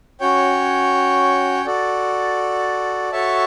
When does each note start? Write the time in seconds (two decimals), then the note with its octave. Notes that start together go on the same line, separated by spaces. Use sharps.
0.20 C#4 F#4 C#5 G5
1.66 F#4 A4 D5
3.12 F#4 A4 C#5 E5 A5